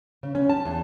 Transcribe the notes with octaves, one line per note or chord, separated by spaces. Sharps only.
C#3
C#4
A5
E2